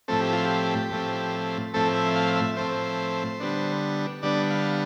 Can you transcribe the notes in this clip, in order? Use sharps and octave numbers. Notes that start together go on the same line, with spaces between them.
A2 F3 A3 C4 A4
G4
F4
G4
A2 F3 A3 C4
A2 F3 A3 C4 A4
E5
F5
E5
A2 F3 A3 C4 C5
D3 G3 B3 D4
D3 G3 B3 D4 D5
F5